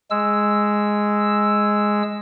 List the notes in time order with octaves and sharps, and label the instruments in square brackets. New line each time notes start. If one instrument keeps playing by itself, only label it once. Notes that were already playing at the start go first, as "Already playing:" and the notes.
[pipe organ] G#3 E6